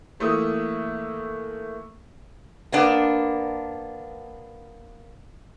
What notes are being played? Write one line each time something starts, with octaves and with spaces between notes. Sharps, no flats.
E3 A3 A#3 E5 D#6
A#3 B3 D4